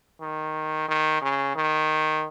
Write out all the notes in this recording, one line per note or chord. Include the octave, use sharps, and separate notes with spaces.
D#3
D#3
C#3
D#3